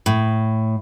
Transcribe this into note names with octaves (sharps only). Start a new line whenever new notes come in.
A2